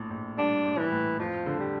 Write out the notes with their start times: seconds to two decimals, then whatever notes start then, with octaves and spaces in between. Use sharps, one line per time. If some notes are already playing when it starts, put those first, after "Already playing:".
Already playing: A#1 A2
0.10 A#1
0.37 G3 D4
0.65 A#1
0.79 E3
0.92 A2
1.19 F2 F3
1.46 D3
1.60 G3